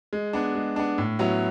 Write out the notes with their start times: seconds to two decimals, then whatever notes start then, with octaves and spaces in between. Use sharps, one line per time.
0.13 G#3
0.33 B3 D4
0.55 G#3
0.76 B3 D4
0.98 A2
1.19 F#3 B3 E4